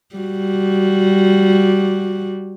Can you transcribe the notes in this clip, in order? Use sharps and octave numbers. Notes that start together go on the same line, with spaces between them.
G3 F#4